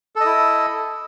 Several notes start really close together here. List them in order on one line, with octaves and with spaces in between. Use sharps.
A4 D#5 E4